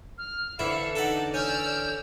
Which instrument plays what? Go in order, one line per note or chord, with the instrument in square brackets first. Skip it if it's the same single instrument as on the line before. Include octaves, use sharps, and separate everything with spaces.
[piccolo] F6
[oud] D3 E3 [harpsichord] E4 [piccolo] E5 [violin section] F5 C#7
[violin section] D#4 D5 [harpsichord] A4 F#5
[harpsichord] C#4 [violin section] D5 E6 F6 [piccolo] G6